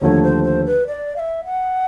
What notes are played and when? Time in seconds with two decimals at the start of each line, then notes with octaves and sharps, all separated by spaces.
0.01 D#2 D3 F3 A3 C#5
0.23 C5
0.44 C5
0.66 B4
0.87 D5
1.16 F5
1.20 E5
1.45 F#5